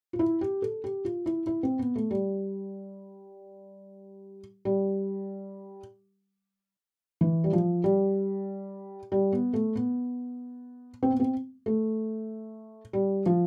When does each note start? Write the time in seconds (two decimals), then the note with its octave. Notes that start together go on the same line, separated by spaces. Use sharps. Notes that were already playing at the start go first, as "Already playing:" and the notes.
0.13 F4
0.19 E4
0.41 G4
0.62 A4
0.84 G4
1.05 F4
1.26 E4
1.47 E4
1.63 C4
1.79 B3
1.96 A3
2.11 G3
4.65 G3
7.21 E3
7.44 G3
7.53 F3
7.84 G3
9.12 G3
9.33 B3
9.53 A3
9.76 B3
11.03 C4
11.11 B3
11.20 C4
11.66 A3
12.93 G3
13.26 F3